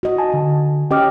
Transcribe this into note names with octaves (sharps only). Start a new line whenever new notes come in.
F#4 D#5
G#5 A5
D3
C#4 G4 D#5 G5 D6 F6